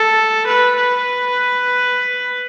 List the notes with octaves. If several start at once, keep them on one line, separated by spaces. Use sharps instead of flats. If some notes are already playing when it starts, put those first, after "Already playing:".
Already playing: A4
B4
B4